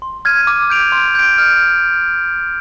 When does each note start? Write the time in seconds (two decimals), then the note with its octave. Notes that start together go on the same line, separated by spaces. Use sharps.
0.02 C6
0.25 F6 G#6 D#7
0.47 D6
0.70 G6 D7 F7
0.92 C6
1.15 G6 D7
1.38 F6